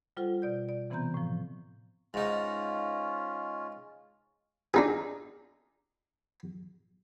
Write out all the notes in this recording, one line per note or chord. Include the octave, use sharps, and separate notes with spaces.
G3 F4 A4 C5 F#5
B2 D5 G6
D5
C3 E3 B3 C4 A#5 G6
A2 F3
G#2 C#4 D#4 F4
D4 D#4 G#4